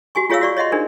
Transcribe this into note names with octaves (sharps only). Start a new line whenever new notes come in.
F#4 G4 G#5 C#6
F4 G#4 C#5 E5 F5 E6
F#4 D5 C#6
C#5 D#5 E5 F#5 C6
D4 D#4 G#4 A#4 C5